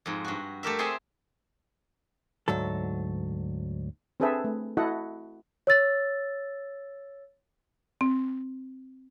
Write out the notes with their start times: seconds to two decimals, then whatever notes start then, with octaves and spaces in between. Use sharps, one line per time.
0.06 F2 G#2
0.24 G2 F#4
0.63 A3 G4 A#4 E5
0.79 C4 G#4 A4 E5 G5 G#5
2.48 D2 G#2 F#3 A4
4.20 C4 D4 G#4 A4 B4 E5
4.44 A3
4.77 E4 F#4 A4 D#5 F#5
5.67 C#5 E6 A6
8.01 C4